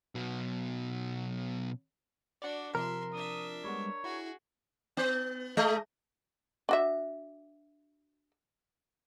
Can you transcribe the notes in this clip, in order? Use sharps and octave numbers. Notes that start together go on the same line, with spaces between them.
B2 F#3
D4 F#4 D5 F#5
C3 F3 A#4 E5 C6
D4 E5 D#6
G3 G#3 B3 C#5
E4 F#4 G#4
B3
G#3 A3 D#5
D4 F#4 E5